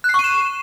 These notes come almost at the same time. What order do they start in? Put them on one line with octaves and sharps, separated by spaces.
F#6 C7 C#6 D#7 E7